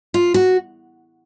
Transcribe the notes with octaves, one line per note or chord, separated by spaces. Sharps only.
F4
F#4